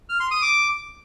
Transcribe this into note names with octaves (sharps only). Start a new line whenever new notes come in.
F6
C6
D#6
D6